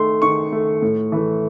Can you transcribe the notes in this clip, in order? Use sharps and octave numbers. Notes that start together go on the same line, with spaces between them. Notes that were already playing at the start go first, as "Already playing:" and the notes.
Already playing: D#3 A3 C6
D#3 C#6
A3
A2
E3 A3